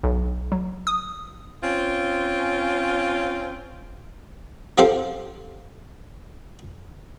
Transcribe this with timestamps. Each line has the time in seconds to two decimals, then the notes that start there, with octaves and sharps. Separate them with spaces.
0.04 B1
0.52 F#3
0.87 D#6
1.63 C4 C#4 F4
4.78 F3 C4 F4 G4 A4 C5